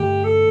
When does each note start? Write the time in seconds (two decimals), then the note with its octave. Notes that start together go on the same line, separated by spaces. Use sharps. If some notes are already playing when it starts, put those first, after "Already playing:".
Already playing: G2 D3 A3 G4
0.24 A4